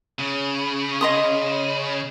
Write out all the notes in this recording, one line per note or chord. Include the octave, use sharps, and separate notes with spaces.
C#3
D#5 C6 D#6